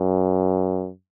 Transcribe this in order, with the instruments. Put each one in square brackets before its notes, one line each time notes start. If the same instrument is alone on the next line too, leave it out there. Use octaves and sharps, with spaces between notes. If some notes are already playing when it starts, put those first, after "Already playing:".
Already playing: [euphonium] F#2